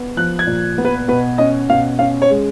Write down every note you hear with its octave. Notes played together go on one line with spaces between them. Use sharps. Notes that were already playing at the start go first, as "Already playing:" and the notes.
Already playing: B3
F3 F#6
G#6
A#2
B3
B4
B2 B4
C#4 D#5
B2 F5
C#4 F5
C#5
G#3